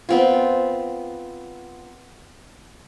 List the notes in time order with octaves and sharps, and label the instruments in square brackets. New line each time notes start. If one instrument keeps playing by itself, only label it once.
[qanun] B3 C4 F4